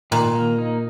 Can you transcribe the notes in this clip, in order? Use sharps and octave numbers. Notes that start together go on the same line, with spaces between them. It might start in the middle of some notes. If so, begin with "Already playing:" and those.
A#2 D#3
A#3
D#4